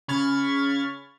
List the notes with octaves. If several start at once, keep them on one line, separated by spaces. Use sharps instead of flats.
C#3 B5 C#6 F6 G#6 A6